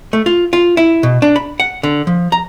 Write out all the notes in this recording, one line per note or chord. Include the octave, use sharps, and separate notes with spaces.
A3
F4
F4
E4
B2
D4
B5
F#5
D3
F3
A#5